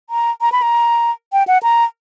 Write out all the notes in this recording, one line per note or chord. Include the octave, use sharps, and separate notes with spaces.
A#5
A#5
B5
A#5
G5
F#5
A#5